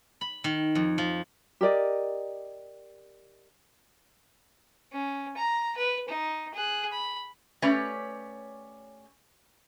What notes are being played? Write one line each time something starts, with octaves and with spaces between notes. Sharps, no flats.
B5
D#3
F2
F3
G4 A#4 D5 D#5
C#4
A#5
B4
D#4
G#4 F#6
B5
A3 C#4 G4 B4 C#5 D5